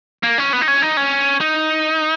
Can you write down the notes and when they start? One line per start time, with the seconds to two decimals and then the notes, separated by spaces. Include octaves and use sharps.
0.23 A#3
0.38 C#4
0.53 B3
0.61 D#4
0.68 C#4
0.82 D#4
0.97 C#4
1.41 D#4